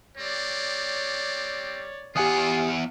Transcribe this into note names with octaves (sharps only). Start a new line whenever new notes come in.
G3 C4 C#5 D5
E2 F4 G4 F#5 G#5 D#6